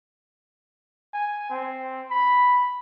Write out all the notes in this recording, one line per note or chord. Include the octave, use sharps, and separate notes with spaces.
G#5
C4
B5